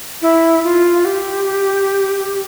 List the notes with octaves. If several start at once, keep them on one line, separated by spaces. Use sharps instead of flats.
E4
F4
G4